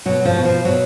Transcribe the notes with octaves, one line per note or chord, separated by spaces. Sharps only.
B2 F#3
F3
B2
F3
B2 F#3